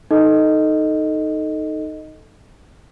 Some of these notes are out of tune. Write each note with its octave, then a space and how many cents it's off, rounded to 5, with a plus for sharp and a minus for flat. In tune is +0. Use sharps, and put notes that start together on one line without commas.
D#4 +0 A4 +0 D#5 +0